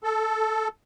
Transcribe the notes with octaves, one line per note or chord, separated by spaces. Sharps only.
A4